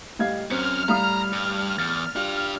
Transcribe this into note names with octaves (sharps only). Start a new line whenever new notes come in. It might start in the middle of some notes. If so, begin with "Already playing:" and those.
A2 G3 D#5 F5 G#6
F#3 C4 C#4 F6 C#7
A2 G3 F5 A#5 D#6
G2
E2 A6
D4 F4 G4